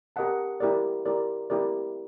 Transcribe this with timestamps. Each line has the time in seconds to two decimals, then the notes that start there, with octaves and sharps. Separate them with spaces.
0.16 G4 A#4 D#5 F#5 A5
0.60 E4 G4 A#4 D5
1.06 E4 G4 A#4 D5
1.50 E4 G4 A#4 D5